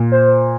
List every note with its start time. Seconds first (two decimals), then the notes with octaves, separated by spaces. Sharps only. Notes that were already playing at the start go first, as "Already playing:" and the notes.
Already playing: A#2
0.12 C5